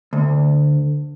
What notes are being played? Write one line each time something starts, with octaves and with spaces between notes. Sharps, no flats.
D2